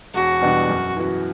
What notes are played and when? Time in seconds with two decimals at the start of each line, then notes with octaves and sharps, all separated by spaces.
0.14 E1 F#4
0.41 E2 B2 G3 D4
0.69 F#2
0.97 E3 B3 F#4